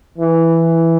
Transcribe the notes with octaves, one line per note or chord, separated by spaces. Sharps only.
E3